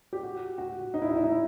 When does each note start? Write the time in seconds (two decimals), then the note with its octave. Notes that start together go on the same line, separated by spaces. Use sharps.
0.13 G4
0.23 F#4
0.58 F#4
0.94 D#4
1.02 E4
1.09 D#4
1.16 E4
1.24 D#4
1.32 E4